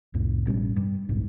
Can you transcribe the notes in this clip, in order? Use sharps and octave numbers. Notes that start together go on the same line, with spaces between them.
C2 F2 A2
A1 B2 G3 C#4
G2
F#1 B1 G#2